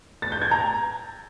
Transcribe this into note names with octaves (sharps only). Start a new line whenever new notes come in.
A6
G6
G#6
A#5